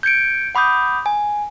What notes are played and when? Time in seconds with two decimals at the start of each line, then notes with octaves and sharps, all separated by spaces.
0.03 G6 G#6 C#7 D7
0.55 F#5 B5 D6 D#6 G6
1.06 G#5